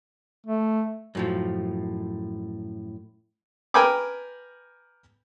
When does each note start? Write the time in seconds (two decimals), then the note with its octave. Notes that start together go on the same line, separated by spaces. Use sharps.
0.46 A3
1.15 F#2 A2 F3
3.74 A#4 B4 G5 G#5 B5 D6